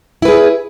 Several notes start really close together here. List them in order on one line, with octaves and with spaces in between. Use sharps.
E4 B4 G#4